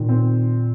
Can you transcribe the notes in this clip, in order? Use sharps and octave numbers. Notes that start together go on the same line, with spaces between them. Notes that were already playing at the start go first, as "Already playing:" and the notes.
Already playing: A#2 D#3
C4